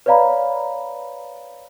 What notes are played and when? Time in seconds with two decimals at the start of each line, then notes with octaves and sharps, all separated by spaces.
0.06 B4 C#5 D5 F5 A#5 B5